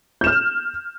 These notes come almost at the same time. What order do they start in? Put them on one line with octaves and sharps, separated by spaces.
G6 E7 F6